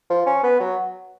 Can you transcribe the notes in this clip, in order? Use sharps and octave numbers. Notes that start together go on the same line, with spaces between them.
F3
C#4
B3
F#3